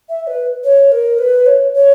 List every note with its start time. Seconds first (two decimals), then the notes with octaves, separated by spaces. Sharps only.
0.09 E5
0.27 B4
0.64 C#5
0.92 A#4
1.18 B4
1.46 C#5
1.74 C#5